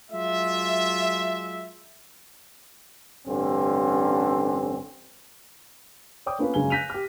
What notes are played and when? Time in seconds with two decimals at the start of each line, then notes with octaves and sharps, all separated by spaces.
0.11 F#3 G#3 F4 E5
3.27 A1 G2 D3 C4 C#4
6.26 C#5 D5 G5 D6 D#6
6.39 A#3 B3 C#4 F4 A4 B4
6.54 F#1 C#3 F#3 G#3 G#5 G7
6.70 F#6 G6 A#6 B6 D#7 F7
6.90 G4 F6